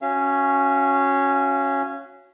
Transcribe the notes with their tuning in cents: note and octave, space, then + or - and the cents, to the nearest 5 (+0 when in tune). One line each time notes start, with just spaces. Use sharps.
C#4 +0 F#4 -5 F5 -35